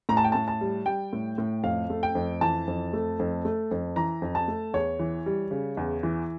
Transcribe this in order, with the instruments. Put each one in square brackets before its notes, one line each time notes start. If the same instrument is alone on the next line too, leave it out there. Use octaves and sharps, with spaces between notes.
[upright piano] A2 A#5
A5
G5
A2 A5
A5
G3
G3 G5
A2
A2
F2 F5
A3
G5
F2
E3 A5
F2
A3
F2
A3
F2
E3 A#5
F2
A5
A3
E2 C#5
E3
G3
C#3
E2
E3